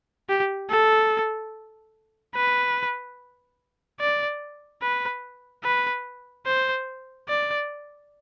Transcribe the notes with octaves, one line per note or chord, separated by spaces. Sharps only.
G4
A4
B4
D5
B4
B4
C5
D5